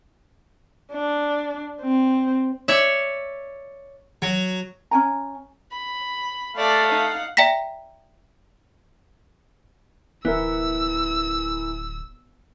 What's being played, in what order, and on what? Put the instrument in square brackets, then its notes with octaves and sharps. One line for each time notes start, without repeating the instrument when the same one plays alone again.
[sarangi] D4
C4
[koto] C#5 D5 E5
[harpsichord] F#3
[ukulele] C#4 G#5 A#5
[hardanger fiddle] B5
[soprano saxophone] A3 [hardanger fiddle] D5 [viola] F5 F#5
[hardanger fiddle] D#4
[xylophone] D5 E5 G5 A#5 A#6 B6
[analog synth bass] D1 [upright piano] E3 E4 A#4 [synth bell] B3 [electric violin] E6